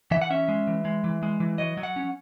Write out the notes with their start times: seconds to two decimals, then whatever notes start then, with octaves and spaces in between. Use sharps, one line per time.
0.11 E3 E5
0.22 F#5
0.30 C#4 E5
0.49 G#3
0.67 E3
0.85 G#3
1.04 E3
1.23 G#3
1.40 E3
1.58 F#3 D#5
1.77 F#3
1.83 F#5
1.96 C#4